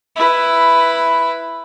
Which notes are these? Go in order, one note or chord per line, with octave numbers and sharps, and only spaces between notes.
E4 B4